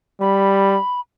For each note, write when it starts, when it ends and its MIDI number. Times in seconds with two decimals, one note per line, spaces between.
0.21 0.78 55
0.21 1.00 83